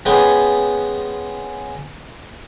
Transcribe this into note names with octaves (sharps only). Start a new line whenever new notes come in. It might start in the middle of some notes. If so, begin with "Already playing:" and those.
G#3 B3 C#4 B4 G5 G#5